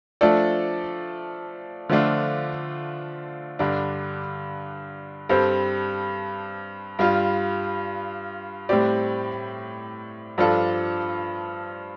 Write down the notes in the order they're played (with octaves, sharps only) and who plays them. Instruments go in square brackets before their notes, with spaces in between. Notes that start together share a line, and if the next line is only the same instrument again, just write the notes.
[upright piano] F3 A3 D4 A4 D5
D3 F3 A3 D4 F4
G2 D3 G3 D4
G2 G3 C4 A4 C5
G2 G3 F4
A2 G3 C4 G4 D5
G2 F3 D4 F4 A4